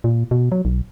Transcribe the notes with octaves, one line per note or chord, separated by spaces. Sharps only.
A#2
B2
F#3
B1